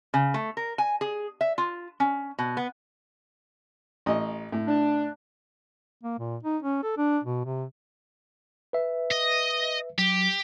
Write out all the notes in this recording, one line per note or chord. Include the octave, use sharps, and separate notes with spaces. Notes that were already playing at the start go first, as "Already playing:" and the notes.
C#3
A3
A#4
G#5
G#4
E5
F4
C#4
B2
B3
A1 D#5
A2
D4
A#3
A#2
D#4
C#4
A4
D4
B2
C3
B4 E5
D#5
F#3 G4